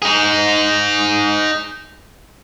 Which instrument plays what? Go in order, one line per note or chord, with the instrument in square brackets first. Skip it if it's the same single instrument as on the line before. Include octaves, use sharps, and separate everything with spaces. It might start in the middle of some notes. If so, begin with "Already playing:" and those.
[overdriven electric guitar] D#4 G#4